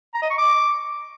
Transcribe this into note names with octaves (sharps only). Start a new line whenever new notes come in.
A#5
D#5
C#6
D6